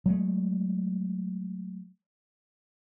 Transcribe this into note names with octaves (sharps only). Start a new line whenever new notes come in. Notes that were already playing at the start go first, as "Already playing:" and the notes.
F#3 G#3 A3